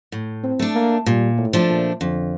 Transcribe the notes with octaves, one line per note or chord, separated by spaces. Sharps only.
A2
C4
A3 D4
A#3
A#2 G3
A2
F3 A3 D4
A#2
F2 D3